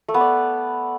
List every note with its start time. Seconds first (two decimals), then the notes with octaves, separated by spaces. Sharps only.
0.08 A3
0.14 B3
0.20 D5